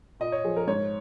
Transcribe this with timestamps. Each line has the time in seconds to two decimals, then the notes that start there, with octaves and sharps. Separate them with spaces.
0.20 A#2 D#5
0.32 C#5
0.44 F3 G#4
0.57 A#4
0.67 G#2 C#5